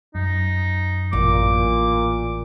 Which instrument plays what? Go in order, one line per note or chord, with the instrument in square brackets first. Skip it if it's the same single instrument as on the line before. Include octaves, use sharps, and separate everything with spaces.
[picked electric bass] F#2 [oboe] D#4
[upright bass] A1 [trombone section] A#2 [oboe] D6